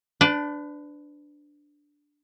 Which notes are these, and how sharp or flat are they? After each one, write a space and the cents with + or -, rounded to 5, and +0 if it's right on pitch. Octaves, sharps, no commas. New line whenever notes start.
D4 +0 B4 +35